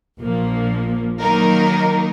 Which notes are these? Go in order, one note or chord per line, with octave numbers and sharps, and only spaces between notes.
A#1 A#2 F3 A#3
D#3 F#3 A#3 D#4 A#4